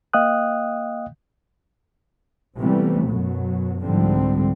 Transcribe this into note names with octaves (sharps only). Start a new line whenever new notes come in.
A#3 D#5 F5 G5 D#6 F#6
C3 E3 G3 A3 B3
F#2 B2 F#3
C2 G#2 D3 F3 G3 C4